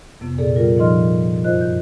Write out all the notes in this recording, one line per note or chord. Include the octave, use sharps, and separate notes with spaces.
F2 C3 B3
A#2 G#4 A4 D5
G3 F4 A#4
A#2 F3 D#4 D#5 C6 F6
F#2 F4 C5 D#5 F#6
G6